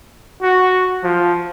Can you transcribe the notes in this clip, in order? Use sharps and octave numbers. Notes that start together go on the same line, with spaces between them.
F#4
F3